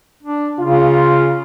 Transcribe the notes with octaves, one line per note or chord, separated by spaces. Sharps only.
D4
C#3 F4